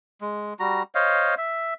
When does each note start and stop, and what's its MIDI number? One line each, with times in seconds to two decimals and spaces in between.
0.21 0.54 56
0.60 0.83 55
0.60 0.83 66
0.60 0.83 82
0.95 1.35 72
0.95 1.35 73
0.95 1.35 75
0.95 1.35 77
1.38 1.74 76